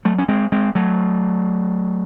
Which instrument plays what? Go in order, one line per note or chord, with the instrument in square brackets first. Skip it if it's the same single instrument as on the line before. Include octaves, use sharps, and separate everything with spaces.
[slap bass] F#3 A3
C#4
G#3 C4
G#3 C4
F#3 A3